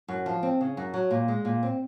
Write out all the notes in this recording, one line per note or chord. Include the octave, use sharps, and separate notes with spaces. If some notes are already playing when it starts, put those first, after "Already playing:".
F#2
F3
C4
C#3
F#2
F#3
A#2
G#3
A#2
C4